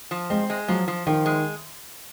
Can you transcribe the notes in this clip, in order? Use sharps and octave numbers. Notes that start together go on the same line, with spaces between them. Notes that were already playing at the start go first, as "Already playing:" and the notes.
F3
G#3 C4
G#3
F3 F#3
F3
D#3 F3
G#3